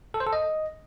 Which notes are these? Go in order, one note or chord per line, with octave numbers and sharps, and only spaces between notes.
A4
C5
A4
D#5